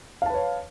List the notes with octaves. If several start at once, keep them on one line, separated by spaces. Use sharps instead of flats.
B4 C#5 F5 A5